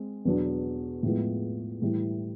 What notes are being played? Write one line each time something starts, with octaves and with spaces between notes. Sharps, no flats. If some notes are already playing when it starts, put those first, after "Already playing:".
Already playing: G#3 C4
E2 B2 F#3 B3 D4
A2 F3 G#3 B3
A2 E3 G3